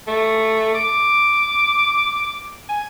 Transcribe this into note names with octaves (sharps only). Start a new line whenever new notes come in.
A3
D6
G#5